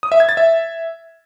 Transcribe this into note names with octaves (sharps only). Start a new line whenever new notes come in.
D#6
E5
G#6
A6
E5